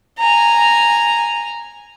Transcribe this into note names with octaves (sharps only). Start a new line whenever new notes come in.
G#5 A#5